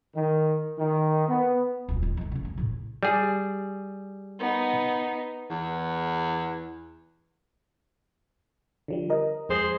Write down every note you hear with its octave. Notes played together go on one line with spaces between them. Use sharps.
D#3
D#3
B3
D#1 D2
D#3
D#3 A3
C#3 A3
E2
A2 C#3
G3 G#4
B3 D#4
E2
D3 F3 G3
A#4 D#5
F2 G#3 G#4 C5